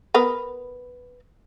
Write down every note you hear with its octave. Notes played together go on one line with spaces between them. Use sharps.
B3 A#4 B4